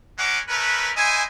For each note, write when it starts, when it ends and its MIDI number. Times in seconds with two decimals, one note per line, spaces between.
0.18 0.39 56
0.18 0.39 61
0.18 0.39 63
0.18 0.39 78
0.18 0.39 86
0.48 0.90 57
0.48 0.90 61
0.48 0.90 70
0.48 0.90 71
0.96 1.22 64
0.96 1.22 72
0.96 1.22 75
0.96 1.22 80